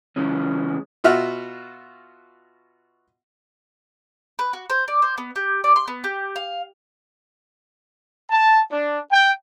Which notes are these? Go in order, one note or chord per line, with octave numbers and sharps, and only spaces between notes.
C#3 E3 G#3 C#4
B2 F4 F#4 E5 F6
B4
F#4
C5
D5
C5
B3
G4
D5
C6
B3
G4
F5
A5
D4
G5